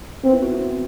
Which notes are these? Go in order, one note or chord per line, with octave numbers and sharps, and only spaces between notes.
B3 C4
E4
F#4
E4
C4